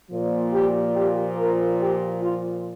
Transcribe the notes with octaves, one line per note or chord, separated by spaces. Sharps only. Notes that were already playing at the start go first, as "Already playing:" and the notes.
A#2 F3
G4
G4
A#4
G4
F4